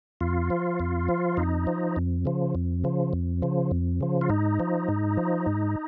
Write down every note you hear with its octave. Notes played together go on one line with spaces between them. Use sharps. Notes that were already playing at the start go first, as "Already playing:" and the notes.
F2 F4
F3
F2
F3
F2 D#4
F3
F2
C#3 F3
F2
C#3 F3
F2
C#3 F3
F2
C#3 F3
F4
G#2 D#4
F3
G#2
F3
G#2